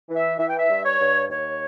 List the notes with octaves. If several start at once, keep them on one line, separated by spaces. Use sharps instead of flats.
E3
E5
E3 E5
G5
E5
G2
C#5
G2
D#2 C#5